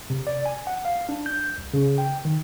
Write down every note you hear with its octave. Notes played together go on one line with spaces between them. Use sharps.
C3
D5
G#5
F#5
F5
D4
G6
C2
C#3
G5
D#3